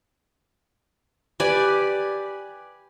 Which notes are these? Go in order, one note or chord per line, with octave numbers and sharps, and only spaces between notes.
G4 B4 D5 G#5